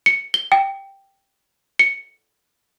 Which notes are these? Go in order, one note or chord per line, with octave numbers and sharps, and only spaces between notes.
C#7
G7
G5
C#7